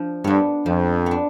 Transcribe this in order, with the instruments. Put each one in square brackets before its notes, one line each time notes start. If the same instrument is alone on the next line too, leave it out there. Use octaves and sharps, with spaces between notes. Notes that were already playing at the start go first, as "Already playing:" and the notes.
Already playing: [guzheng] F3 D4
[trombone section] G2 [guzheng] B3 D4
[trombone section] F2 [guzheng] F3
[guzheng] B3 D4